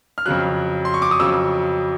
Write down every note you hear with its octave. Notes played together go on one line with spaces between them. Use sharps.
F6
F2 C#3 F#3 F#6
C6
C#6
D6
D#6
F2 C#3 F#3 E6